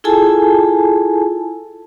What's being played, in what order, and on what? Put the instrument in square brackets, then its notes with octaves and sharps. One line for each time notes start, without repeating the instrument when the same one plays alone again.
[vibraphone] E4 F4 G#4 A4 G#5 A5